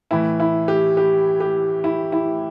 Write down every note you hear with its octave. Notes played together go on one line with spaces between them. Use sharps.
A2 E3 E4
E4
G4
G4
G4
E4
E4